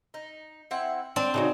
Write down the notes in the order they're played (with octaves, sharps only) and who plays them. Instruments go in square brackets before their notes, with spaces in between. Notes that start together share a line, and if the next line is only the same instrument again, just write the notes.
[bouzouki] D#4
C4 E4 F#5
[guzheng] C4 [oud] D4 [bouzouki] D5
[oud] C#3 D#4 F#4